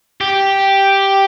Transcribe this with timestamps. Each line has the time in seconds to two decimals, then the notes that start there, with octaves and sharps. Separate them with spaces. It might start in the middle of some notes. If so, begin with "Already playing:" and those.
0.21 G4